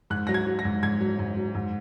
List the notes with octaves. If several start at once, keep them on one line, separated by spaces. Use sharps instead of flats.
G#2 F#6
F#3 A#6
G#6
F#3
A#6
G#2
G#2 G#6
F#3
G#2
F#3
G#2